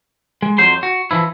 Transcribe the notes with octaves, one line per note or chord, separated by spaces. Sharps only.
G#3
F2 F#3 C5 C6
F#4
E3 F3 E4